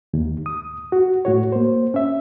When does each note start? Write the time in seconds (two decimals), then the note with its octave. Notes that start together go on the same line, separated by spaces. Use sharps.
0.14 D#2
0.46 D#6
0.92 F#4
1.25 A2 F#4 C#5
1.52 A#3 C5
1.94 C#4 E5